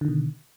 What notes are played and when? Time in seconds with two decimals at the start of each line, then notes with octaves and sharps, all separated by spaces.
0.01 D3
0.05 D#3
0.08 B2